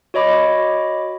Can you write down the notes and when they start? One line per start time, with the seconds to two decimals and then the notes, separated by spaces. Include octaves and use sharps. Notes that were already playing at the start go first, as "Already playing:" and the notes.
0.14 F#4 C#5 D#5 B5 D6